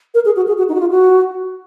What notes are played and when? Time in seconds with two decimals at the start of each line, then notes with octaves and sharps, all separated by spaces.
0.14 A#4
0.25 G#4
0.36 F#4
0.48 G#4
0.58 F#4
0.69 D#4
0.75 F#4
0.80 F4
0.90 F#4